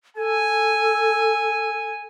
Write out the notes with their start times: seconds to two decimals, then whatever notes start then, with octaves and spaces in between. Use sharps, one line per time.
0.17 A4 G#5